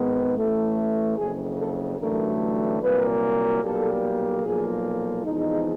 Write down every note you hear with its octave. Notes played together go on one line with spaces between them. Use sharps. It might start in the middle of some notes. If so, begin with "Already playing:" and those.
Already playing: G#1 G#2 D#3 G#3 B3
A1 A2 E3 A3
F#1 F2 C#3 G#4
A4
A1 G2 D3 F#3 A3 A#4
C2 A#2 F#3 A#3 B4
B1 A#2 G3 A#3 A4
B1 A#2 F3 A#3 G#4
E2 C3 F3 G#3 D#4